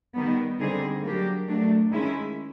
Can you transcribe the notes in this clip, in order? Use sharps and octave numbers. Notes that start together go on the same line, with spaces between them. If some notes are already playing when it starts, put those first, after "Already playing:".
D#3 G3 B3
D3 G3 C4 D#4 G#4
F#3 A#3 D4 G4
F#3 A3 D4
D#3 G#3 C#4 E4